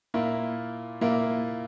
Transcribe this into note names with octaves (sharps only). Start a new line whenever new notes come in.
A#2 A#3 E4 A#4
A#2 A#3 E4 A#4